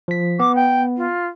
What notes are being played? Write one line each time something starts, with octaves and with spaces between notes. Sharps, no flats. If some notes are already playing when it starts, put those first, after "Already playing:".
F3 B6
B3 D6
G5
F4